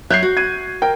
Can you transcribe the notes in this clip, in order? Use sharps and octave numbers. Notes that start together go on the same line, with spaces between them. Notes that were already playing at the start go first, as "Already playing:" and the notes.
F#3 C#5 E5 F#6 G6 C7
F#4
G#6 D#7
A#4 G5